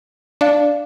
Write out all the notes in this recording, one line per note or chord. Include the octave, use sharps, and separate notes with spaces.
D4 D5 F5